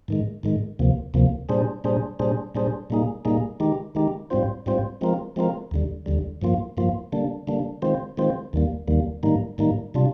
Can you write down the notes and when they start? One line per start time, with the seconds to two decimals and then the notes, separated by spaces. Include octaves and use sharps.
0.08 G#2 D#3 G#3
0.43 G#2 D#3 G#3
0.79 D2 C3 F3 A#3
1.14 D2 C3 F3 A#3
1.49 A#2 G3 D4 G#4 C5
1.84 A#2 G3 D4 G#4 C5
2.19 A#2 G3 D4 G#4 C5
2.55 A#2 G3 D4 G#4 C5
2.90 A#2 G3 A#3 D#4 G#4
3.25 A#2 G3 A#3 D#4 G#4
3.60 D#3 G#3 D#4 G4
3.95 D#3 G#3 D#4 G4
4.30 G#2 G3 C4 F4 C5
4.66 G#2 G3 C4 F4 C5
5.01 F3 G#3 C4 F4 A#4
5.36 F3 G#3 C4 F4 A#4
5.71 D#2 D3 G3
6.06 D#2 D3 G3
6.42 G2 F3 A#3 F4
6.77 G2 F3 A#3 F4
7.12 D3 G3 A#3 D4
7.47 D3 G3 A#3 D4
7.82 D#3 G#3 C4 F4 C5
8.17 D#3 G#3 C4 F4 C5
8.53 D#2 D#3 G3 A#3
8.88 D#2 D#3 G3 A#3
9.23 G#2 D#3 G3 A#3 D#4
9.58 G#2 D#3 G3 A#3 D#4
9.94 C3 G3 D4 F4